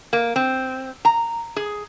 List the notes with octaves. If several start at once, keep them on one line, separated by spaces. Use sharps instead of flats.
A#3
C4
A#5
G#4